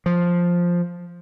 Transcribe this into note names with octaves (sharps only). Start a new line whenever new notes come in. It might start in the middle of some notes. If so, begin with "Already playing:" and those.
F3